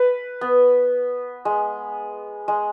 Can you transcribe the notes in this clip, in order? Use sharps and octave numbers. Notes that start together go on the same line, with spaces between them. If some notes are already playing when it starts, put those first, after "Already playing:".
Already playing: B4
B3
G#3
G#3